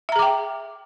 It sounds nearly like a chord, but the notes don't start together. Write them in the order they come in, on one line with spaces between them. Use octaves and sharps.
E5 A#5 G#4 D6 G5